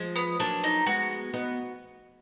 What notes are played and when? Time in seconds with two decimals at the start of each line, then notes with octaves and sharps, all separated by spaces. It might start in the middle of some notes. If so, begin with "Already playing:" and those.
Already playing: F3 G#3
0.16 B3
0.40 F#3 A#3 D4
0.64 D#4
0.86 G#3 B3 F#4
1.33 B3 D#4